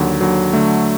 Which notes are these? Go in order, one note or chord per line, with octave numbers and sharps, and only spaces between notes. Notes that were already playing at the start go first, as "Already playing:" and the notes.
Already playing: D#2 D3 F#3
D#2 D3 F#3
D3 F#3 A3